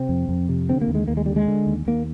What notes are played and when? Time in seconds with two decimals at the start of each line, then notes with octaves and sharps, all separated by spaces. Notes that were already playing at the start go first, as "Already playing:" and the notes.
Already playing: C3 C4
0.09 F2
0.29 F2
0.49 C3
0.69 D3 C4
0.81 A#3
0.88 D#2
0.95 G#3
1.08 D#2 A#3
1.17 G#3
1.26 D3 G3
1.36 G#3
1.48 D3
1.67 D#2
1.87 D#2 A#3